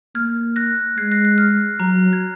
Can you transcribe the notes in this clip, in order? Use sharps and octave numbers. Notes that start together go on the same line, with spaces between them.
A#3 F6 G#6
F#6 A#6
G#3 G#6 C7
F#6 A#6
F#6
F6
F#3 A#5
G#6